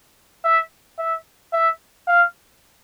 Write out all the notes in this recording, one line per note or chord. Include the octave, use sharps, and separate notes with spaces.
E5
E5
E5
F5